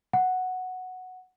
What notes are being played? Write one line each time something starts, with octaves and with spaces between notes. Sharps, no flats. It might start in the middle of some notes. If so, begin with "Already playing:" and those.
F#5